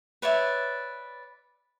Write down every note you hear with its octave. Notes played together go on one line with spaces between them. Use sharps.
B4 C#5 D5 E5